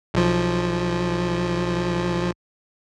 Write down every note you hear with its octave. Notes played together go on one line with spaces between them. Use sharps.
B1 F3